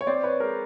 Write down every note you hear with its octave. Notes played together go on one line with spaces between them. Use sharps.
C#5
C4 C5 D5
B4 C#5
G#3 A#4